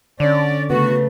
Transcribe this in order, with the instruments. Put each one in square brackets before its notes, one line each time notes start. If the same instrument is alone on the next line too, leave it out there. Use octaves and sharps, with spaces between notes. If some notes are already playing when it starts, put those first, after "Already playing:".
[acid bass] D3 [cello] C#4 [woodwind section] D5
[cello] C#3 A3 [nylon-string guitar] B3 [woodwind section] F#4